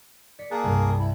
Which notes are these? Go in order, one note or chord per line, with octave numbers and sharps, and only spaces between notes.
D5 B6 C#7
A#3 G#4 A#4 A5 F#6
C2 G2
E4